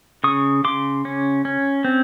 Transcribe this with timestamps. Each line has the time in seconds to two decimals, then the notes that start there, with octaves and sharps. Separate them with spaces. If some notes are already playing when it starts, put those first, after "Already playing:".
0.24 C#3 C#6 D#6
0.64 C#3 C6 D6
1.05 C#4
1.45 C#4
1.85 C4